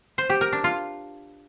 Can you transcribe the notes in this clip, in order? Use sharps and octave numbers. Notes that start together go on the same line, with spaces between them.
C5
G4
A#4
D4
F4